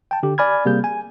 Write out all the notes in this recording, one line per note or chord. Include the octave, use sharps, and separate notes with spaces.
G5 A5
D3 G4
D5 G#5 B5 F6 G#6
C3 G3 A#3 G#4 G6
G#5